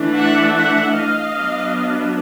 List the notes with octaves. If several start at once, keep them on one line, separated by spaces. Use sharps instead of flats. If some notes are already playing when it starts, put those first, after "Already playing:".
Already playing: E3 A3 D4
E5 F#5
E5 F#5
D#5 F5
F#3 B3 D4